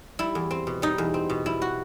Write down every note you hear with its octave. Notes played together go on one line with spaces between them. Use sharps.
G3 E4
E2
C4
B2
G3 D#4
E2
C4
B2
G3 E4
F#4